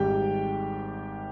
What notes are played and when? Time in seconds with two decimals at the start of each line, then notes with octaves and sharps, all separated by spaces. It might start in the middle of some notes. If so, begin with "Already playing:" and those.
Already playing: G#1 G#2 G3 G4 G5